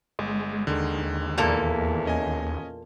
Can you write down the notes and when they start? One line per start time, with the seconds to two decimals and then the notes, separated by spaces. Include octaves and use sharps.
0.19 G1 G#3
0.67 D#2 D3 D#3 G#3
1.38 E2 A#2 A#3 A4
2.05 C#4 D#5 G#5